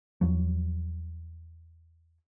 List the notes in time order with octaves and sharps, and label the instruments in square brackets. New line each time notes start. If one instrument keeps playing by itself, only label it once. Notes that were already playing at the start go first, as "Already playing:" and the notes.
[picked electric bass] E2 F3 F#3